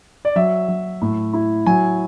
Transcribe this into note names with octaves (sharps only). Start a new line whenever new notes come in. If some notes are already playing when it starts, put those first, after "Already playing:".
D5
F#3 E5
F#3
A2
E4
F#3 G#5